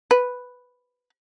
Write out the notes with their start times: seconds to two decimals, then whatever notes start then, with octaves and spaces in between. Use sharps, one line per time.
0.11 B4